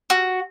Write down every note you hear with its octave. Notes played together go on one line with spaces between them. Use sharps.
F#4